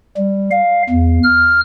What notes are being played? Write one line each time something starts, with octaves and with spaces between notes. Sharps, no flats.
G3
F5
E2
F6